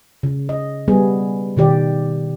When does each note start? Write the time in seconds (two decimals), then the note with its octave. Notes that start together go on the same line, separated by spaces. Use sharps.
0.23 C#3
0.49 D#5
0.88 G3 B3 G#4
1.57 B2 D#3 G4 D5